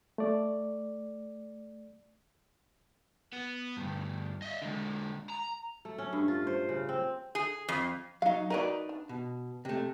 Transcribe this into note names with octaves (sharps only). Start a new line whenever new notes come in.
A3 D5
B3
D2 G2
D#5 E5
D3 G#3
A#5
A3
C#4
G2
F4
C5
C#3
C4
G#4
F2
F#3 D#4 F5
F#3 D#4 A#4 B4 D5
D4
B2
C3 A3